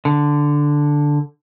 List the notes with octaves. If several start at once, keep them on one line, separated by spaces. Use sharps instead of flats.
D3